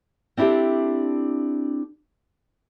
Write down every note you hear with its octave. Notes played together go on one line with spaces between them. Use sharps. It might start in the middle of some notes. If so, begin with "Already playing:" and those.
C4 D4 E4 F#4 G4 A4